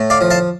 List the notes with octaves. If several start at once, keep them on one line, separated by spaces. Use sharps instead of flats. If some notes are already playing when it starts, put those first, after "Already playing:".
Already playing: A2
D5 F5
F3
F5 A5